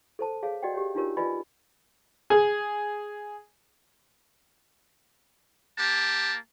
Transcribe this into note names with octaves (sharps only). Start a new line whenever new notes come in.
A4 C5 A5
G#4 C#5 F5
F#4 D5 D#5 F#5 G5
G4 C#5
D4 D#4 F4 G4 A#4 C#5
F4 B4 D5 D#5 G#5 B5
G#4
A#3 G4 A5